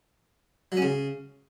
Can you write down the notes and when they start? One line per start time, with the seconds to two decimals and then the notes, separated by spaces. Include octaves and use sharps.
0.72 F#3
0.77 C#4
0.82 C#3